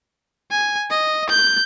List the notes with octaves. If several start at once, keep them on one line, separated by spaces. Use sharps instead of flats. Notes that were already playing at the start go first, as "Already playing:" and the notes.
G#5
D#5
G6